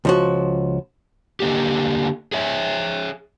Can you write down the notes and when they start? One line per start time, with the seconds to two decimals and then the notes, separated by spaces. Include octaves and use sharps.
0.05 C#2 F3 F#4
1.40 D3 A#3 G4
2.32 G#4 C#5 E5